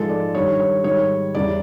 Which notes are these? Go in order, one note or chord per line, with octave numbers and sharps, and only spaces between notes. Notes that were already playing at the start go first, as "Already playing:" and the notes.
Already playing: G#2 F3 G#3 A4
D5
G2 D#3 G3 C#5
C#5
G#2 D#3 G3 C#5
E2 C#3 E3 G3 D5